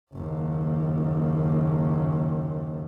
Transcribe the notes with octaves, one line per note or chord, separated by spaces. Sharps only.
F#1 D#2